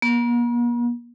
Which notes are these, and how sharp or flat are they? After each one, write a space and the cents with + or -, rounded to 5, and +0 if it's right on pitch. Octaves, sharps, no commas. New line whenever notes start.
A#3 +45